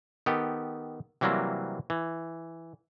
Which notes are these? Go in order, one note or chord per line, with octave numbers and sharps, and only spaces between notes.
D#3 B3 G4 A4
C3 E3 F#3 G3 A#3 C4
E3